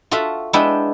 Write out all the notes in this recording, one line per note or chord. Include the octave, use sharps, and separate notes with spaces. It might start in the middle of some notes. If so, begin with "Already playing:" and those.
F4 F#4 A4 E5
G#3 B3 D4 E4 G5